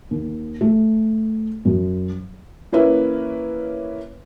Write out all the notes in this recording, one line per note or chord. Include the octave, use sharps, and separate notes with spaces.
D#2
A3
F#2
E3 A#3 C#4 E4 B4 E5